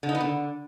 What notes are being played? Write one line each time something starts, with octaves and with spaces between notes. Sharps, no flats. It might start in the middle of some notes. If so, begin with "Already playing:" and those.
D3
D#4
B3
D3